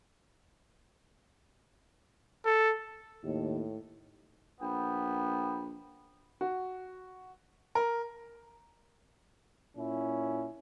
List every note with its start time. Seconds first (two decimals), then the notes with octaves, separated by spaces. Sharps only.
2.45 A4
3.24 D#2 A2
4.61 A#1 B3 G5 B5
6.41 F#4
7.75 A#4
9.76 A#2 C#4 E4